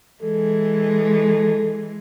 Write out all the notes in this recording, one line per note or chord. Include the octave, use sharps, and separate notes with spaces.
E3 G#3 A4